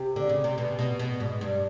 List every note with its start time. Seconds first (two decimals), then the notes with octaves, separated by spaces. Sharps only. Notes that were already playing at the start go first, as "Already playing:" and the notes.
Already playing: C3
0.16 D3
0.29 C#3
0.44 C3
0.58 B2
0.79 B2
0.99 B2
1.20 G#2
1.41 G2